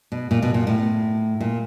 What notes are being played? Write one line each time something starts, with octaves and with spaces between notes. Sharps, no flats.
B2
A#2
B2
A#2
A2
A#2